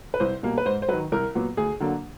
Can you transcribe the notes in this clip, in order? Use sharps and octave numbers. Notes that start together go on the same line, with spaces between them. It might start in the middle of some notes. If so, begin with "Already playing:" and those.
B4
C2 C5
B2 G3 A#3
B4
G#2 C5
C5
D#3 F#3 B4
C2 A#4
A#2 F#3 B3
D2 G#4
D3 F#3 A#3 D4